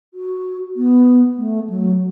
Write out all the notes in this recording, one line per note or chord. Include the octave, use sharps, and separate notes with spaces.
F#4
B3
A3
F#3